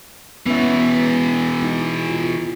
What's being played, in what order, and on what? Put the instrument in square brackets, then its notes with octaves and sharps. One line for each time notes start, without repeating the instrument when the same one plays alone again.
[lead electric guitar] B2 E3 [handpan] B3 C#4 E5
[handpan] D#4
F4